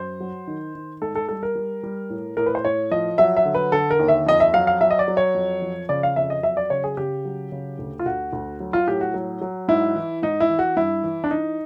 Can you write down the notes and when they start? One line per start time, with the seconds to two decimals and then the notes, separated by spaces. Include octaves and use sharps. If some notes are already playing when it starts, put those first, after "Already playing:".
Already playing: F#2 C5
0.20 F#3
0.47 D#3
0.75 D#3
1.02 G#2 A4
1.15 A4
1.28 G3 A4
1.43 A#4
1.55 G3
1.83 G3
2.10 A2
2.37 A2 A#4
2.46 B4
2.55 C5
2.64 A2 C#5
2.91 F3 D#5
3.18 F#3 E5
3.37 E5
3.45 D3
3.55 B4
3.72 D3 A4
3.91 A#4
3.99 D#2
4.08 E5
4.27 F2 D#5
4.40 E5
4.54 F#3 F5
4.67 F5
4.81 F#3 E5
4.91 D#5
4.99 D5
5.08 F#3
5.17 C#5
5.35 F2
5.62 F3
5.89 C#3 D5
6.03 F5
6.16 F2 E5
6.30 D#5
6.43 F#3 E5
6.57 D5
6.70 C#3 C#5
6.84 G#4
6.97 C#3 G4
7.25 F#3
7.52 C#3
7.79 D2
7.99 F4
8.06 D2 F#4
8.33 D2
8.60 F#3
8.73 F4
8.87 A2 G4
9.01 F#4
9.14 F#3
9.41 F#3
9.68 G#2 E4
9.96 E3
10.23 G#2 D#4
10.40 E4
10.50 E3
10.59 F#4
10.77 G2 E4
11.03 E3
11.24 D4
11.30 E3 D#4